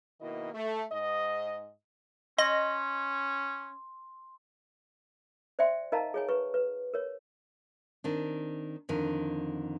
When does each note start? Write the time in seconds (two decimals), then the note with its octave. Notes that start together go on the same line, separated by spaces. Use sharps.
0.21 B2 D#3 A#3 E4 D#5
0.54 A3
0.92 G#2 D#5
2.38 C#4 D#5 C6 A#6
5.59 C5 D5 E5 G5 C6
5.92 D#4 A#4 D#5 F5 A5 A#5
6.14 G#4 C#5 G#5
6.29 B4 C#6
6.54 B4
6.94 A#4 C#5
8.04 D#3 C4 D4
8.89 F2 D3 D#3